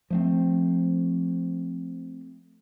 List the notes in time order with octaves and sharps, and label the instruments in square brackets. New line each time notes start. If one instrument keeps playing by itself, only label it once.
[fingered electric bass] F3 A3 C4